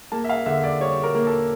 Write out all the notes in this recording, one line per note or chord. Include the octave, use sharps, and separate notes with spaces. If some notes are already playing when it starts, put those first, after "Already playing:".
A#3 A5
E5
F5
D3 E5
D5
G3 C#5
A#4
A#3
A4